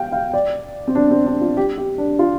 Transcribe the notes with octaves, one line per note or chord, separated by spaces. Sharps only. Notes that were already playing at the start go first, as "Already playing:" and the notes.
Already playing: F5 G5
F5
D5
C4
D4
C4
D4
F4
G4
G4
D4
F4